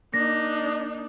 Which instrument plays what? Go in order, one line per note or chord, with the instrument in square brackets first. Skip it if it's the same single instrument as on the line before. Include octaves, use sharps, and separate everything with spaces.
[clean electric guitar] A#3 [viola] D4 D#4 [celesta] A#6